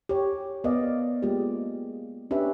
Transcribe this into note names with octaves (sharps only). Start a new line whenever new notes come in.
G4 C#5
B3 A#4 D5 D#5 F5
G#3 A#3 F4 G4
C#4 D4 G4 B4 E5